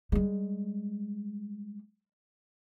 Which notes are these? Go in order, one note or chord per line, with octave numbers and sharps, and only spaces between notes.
G3 G#3